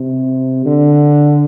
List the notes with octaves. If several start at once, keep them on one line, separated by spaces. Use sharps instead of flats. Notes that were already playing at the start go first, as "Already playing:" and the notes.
Already playing: C3
D3